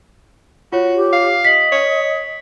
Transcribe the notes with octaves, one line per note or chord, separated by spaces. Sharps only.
F4 F#4 C#5
G4
F5
D#5 B6 F#7
C#5